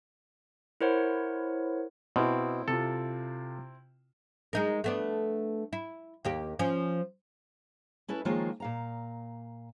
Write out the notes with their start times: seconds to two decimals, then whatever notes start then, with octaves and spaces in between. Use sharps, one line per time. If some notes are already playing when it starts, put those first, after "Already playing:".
0.81 E4 A#4 C5 C#5 F#5
2.16 B2 C4 E4
2.68 C3 F4 A4
4.53 G#3 D#4 A#4
4.84 A3 B3 D4
5.73 E4
6.25 D#2 A#3 G4
6.59 F3 C#4
8.08 C#4 E4 A4 B4
8.25 D#3 F3 G#3 A#3 F4 C#5
8.60 A#2 F5 A#5